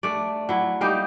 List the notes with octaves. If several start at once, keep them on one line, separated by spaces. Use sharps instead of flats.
A3 D4 D5
F#3 E4
G3 A#3 D#4 G4